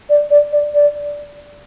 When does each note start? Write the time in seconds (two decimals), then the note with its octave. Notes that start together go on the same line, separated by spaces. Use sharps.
0.10 D5
0.31 D5
0.53 D5
0.74 D5